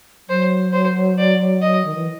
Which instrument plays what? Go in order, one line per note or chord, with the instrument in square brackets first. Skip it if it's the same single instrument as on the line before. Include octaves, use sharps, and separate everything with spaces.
[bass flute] F#3 [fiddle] C5
[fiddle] C5
D5
D#5
[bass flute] D#3
E3